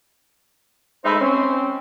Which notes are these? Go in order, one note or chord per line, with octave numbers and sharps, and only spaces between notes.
G#3 A3 D#4 B4 C5 E5
C4 C#4